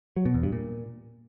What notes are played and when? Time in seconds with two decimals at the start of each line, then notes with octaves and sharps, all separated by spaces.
0.16 F#3
0.25 B2
0.34 E2
0.43 G2
0.52 A#2